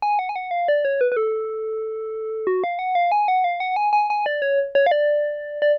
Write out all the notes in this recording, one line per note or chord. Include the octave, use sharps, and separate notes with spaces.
G#5
F#5
G#5
F#5
F5
D5
C#5
B4
B4
A4
F#4
F5
F#5
F5
G#5
F#5
F5
F#5
G#5
G#5
G#5
D5
C#5
C#5
F5
D5
D5